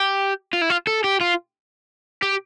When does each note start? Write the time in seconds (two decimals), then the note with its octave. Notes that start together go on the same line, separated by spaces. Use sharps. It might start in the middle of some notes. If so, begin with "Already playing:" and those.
Already playing: G4
0.53 F4
0.61 E4
0.70 F4
0.87 A4
1.04 G4
1.21 F4
2.23 G4